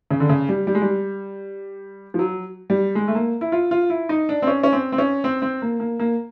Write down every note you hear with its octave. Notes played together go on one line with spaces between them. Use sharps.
C#3
D3
C#3
G3
G3
G#3
G3
F3
F#3
G3
G#3
A3
A#3
E4
F4
F4
E4
D#4
D4
C4
C#4
C#4
C4
C4
C#4
C4
C4
A#3
A#3
A#3